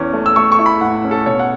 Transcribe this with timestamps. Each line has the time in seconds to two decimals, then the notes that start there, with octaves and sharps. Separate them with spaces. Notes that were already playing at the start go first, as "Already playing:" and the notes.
Already playing: E2 E3 C#4
0.13 A3
0.26 E6
0.36 A3 C#6
0.52 C#6
0.59 E4
0.66 B5
0.81 A2 F#5
1.04 C#4
1.11 A4
1.26 B2 C#5
1.39 F#5